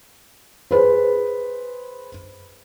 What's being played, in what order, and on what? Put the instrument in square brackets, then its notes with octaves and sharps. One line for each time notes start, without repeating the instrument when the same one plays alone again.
[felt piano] G#4 B4 C5